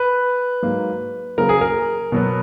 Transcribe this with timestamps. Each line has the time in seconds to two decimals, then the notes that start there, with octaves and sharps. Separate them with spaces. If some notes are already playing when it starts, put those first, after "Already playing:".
Already playing: B4
0.62 G#2 F#3 A#3
1.38 C#3 F#3 A#3 A#4
1.49 G#4
1.61 A#4
2.12 B2 F#3 B3